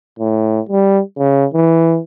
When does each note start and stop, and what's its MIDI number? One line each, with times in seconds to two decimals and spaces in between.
0.19 0.60 45
0.69 1.01 55
1.18 1.46 49
1.54 1.99 52